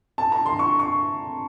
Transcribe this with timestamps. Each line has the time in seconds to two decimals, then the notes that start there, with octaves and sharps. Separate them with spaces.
0.18 A5
0.32 A#5
0.46 C6
0.59 C#6
0.79 C#6